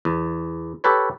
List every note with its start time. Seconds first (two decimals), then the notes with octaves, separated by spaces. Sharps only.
0.05 E2
0.84 G4 A4 B4 C#5